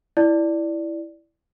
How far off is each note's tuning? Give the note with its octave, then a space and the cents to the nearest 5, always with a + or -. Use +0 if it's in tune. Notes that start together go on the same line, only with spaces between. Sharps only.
E4 +0 D5 +0